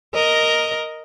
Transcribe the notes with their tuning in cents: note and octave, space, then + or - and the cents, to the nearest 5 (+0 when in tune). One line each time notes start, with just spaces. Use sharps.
A#4 +0 D#5 +0